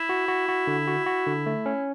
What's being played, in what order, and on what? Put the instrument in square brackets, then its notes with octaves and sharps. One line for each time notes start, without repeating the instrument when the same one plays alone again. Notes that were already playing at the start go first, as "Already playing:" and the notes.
Already playing: [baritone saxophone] E4
[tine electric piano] F#4
F#4
F#4
D3
F#4
F#4
D3
A3
C#4